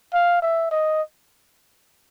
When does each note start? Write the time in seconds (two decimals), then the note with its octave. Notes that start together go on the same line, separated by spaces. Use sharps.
0.13 F5
0.42 E5
0.71 D#5